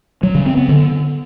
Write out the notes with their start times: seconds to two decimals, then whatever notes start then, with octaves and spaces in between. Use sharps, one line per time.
0.23 F#3
0.35 C#3
0.46 C4
0.57 B3
0.69 D3